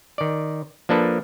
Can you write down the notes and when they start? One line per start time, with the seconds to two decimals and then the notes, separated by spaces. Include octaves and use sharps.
0.18 D#3 D5
0.89 F3 A#3 D4 A4 B4